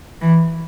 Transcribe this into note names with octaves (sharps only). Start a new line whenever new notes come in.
E3